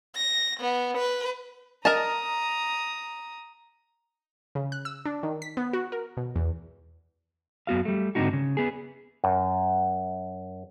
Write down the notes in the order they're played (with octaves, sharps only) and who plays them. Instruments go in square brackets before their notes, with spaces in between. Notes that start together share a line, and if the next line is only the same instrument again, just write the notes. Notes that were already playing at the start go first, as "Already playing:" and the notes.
[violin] A#6
B3
B4
[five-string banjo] A#4 D#5 A5 [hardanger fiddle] A#5 D#6
[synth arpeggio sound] C#3
F#6
E6
D4
D#3
B6
B3
F#4
A#4
B2
E2
[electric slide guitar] F#2 B3 F#4 F5
G3 A3
G#2 D3 F3 C4 D#4 F#4
C#3
B3 G#4
[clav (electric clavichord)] F#2